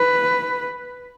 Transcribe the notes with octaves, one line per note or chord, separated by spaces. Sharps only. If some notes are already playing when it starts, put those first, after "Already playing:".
Already playing: B4